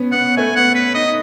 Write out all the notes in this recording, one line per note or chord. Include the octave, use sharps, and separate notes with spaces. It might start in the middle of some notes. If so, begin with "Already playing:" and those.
Already playing: B3 C#4
B3 F#5
A3 G#5
B3 F#5
B4
D#4 D#5